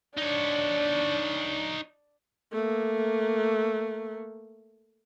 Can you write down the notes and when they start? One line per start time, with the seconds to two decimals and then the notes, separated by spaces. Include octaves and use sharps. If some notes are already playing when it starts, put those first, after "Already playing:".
0.17 D4 D#4 C#5
2.52 A3 A#3